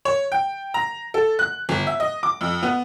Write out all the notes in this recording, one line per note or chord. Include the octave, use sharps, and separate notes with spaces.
C#5
G5
A#5
A4
F#6
G1
E5
D#5
D6
F2
B3